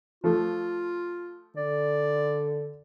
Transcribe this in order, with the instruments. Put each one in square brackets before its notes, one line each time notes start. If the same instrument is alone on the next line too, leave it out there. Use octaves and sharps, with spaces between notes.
[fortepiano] F3 A3 [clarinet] F4
[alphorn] D3 [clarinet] D5